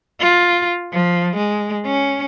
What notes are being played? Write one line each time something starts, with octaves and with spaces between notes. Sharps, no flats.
F4
F3
G#3
C#4